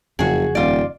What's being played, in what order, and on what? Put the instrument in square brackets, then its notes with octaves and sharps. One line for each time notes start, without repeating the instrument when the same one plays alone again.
[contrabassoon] F#1 [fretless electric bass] F2 C#3 F3 [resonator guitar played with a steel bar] F#4 G#4
[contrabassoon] D#1 [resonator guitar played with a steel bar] F4 D5